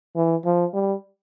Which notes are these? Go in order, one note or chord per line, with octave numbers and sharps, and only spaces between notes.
E3
F3
G3